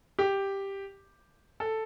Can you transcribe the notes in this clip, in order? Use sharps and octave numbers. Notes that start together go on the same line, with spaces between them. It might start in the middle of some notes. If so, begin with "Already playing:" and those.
G4
A4